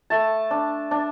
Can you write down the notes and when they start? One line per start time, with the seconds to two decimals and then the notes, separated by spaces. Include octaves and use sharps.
0.10 A3 A5
0.51 D4
0.91 D4